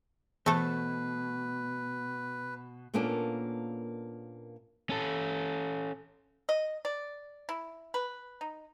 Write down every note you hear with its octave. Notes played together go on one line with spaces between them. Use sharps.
B2 E3 A3 A4 B4
A#2 A#3 B3 C#4 D4 A4
C#4 A4
D#5
D5
E4
B4
D#4